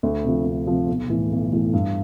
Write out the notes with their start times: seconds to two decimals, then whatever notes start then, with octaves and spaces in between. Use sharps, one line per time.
0.03 D2
0.25 C3 F3
0.45 D2
0.67 C3 F3
0.88 B1
1.10 A2 E3
1.31 B1
1.53 A2 E3
1.73 G2